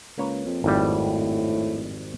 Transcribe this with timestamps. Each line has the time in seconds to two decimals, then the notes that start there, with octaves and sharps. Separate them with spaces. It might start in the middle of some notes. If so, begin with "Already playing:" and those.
0.18 C#2 A#3 B4 C#5
0.46 F2
0.64 G#1 F2 A2 G3